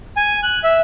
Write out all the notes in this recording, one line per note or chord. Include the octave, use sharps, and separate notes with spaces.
G#5
F#6
E5